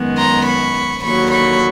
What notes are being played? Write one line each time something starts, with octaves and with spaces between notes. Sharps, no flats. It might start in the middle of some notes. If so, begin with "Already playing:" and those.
Already playing: F#2 D#3 G#3 B3
A#5 C6
B5 C#6
D#2 D3 F#3 B5 C#6
B5 C#6